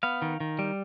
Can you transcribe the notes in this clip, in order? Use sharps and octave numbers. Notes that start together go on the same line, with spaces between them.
B3 F5
D#3
D#3
G3